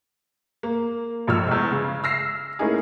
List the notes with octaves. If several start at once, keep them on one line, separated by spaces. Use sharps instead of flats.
A#3
F1 A#1 F3 C#6 E6 F6
E2 G#3
C#3
E6 F6 A#6 C7
A3 A#3 C#4 D#4 E4 G#4